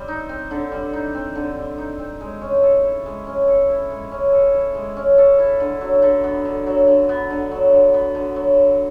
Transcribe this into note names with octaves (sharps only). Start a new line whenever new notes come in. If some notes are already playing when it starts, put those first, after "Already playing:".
Already playing: G3 C4
D#4
C4
D3
G3
D#4
C4
D3
G3
D#4
C4
G#3
C#4
A4
E4
G#3
C#4
A4
E4
G#3
C#4
A4
E4
G#3
C#4
A4
E4
D3
F#3
D3
B3
D3
F#3
D3
B3
D3
F#3
D3
B3
D3
F#3
D3